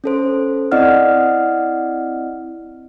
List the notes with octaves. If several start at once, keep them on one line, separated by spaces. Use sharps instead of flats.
C#4 A4 C5
C4 E4 D5 D#5 F#5 F6